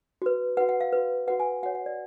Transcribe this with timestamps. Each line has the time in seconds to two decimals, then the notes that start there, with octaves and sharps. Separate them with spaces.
0.22 F#4 B4
0.57 F#4 B4 F#5
0.69 F#5
0.81 F5
0.93 F#4 B4
1.28 F#4 B4 F#5
1.40 G#5
1.63 F#4 F#5
1.66 C#5
1.75 F#5
1.86 D5